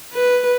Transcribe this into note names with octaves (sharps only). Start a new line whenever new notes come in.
B4